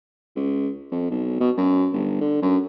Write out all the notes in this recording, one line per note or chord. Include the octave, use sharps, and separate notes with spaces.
C#2
F2
B1
B2
F#2
G1
D3
F#2